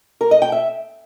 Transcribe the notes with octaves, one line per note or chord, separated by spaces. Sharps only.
A#4
D#5
G5
E5